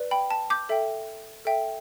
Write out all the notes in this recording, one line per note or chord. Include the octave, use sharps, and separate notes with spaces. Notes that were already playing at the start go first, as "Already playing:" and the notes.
Already playing: B4 D5
G5 B5
A5
D6 G6
A4 E5 G5
A4 E5 G5